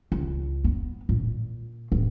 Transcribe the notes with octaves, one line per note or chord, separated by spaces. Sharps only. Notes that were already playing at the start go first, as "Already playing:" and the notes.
C#2
B3
A#2
D1